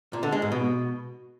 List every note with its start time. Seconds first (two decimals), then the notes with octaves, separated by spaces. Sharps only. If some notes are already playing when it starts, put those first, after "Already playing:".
0.13 A#2
0.23 D3
0.32 G#3
0.42 G#2
0.52 B2